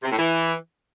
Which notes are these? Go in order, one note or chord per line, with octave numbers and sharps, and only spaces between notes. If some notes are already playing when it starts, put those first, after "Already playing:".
C3
A2
E3